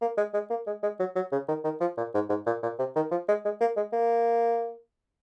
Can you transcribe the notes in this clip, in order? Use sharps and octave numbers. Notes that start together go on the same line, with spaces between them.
A#3
G#3
G#3
A#3
G#3
G#3
F#3
F#3
C#3
D#3
D#3
F3
A#2
G#2
G#2
A#2
A#2
C3
D#3
F3
G#3
G#3
A#3
G#3
A#3